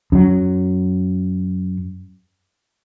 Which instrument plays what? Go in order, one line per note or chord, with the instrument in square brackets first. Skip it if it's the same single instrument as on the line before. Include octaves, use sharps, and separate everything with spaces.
[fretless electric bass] F#2 F#3